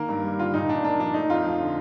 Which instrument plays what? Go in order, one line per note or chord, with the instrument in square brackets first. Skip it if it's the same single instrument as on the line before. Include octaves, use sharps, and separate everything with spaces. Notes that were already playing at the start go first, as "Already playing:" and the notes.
Already playing: [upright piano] D#3 A#3 A#4
G2
G3
D3 F4
A#2 D#4
A#2 D4
A#3 D4
F3 D4
A3 D#4
F2 F4
F3
D3